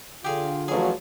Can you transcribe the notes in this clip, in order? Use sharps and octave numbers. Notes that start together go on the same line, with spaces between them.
D3 F4 G4 G#4
A1 F3 F#3 G#4